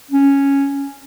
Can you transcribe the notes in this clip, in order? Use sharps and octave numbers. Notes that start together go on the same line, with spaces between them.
C#4